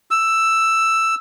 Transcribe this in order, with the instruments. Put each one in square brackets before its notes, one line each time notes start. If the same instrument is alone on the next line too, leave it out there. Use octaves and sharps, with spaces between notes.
[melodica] E6